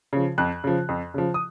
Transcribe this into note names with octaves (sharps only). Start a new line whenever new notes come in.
C#3 F3
F2 F#6
C#3 F3
F2
C#3 F3
D#6